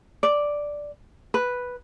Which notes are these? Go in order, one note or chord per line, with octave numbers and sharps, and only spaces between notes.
D5
B4